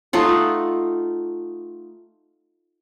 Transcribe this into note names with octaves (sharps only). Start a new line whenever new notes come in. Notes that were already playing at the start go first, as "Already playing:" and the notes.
A3 D#4 F4 F#5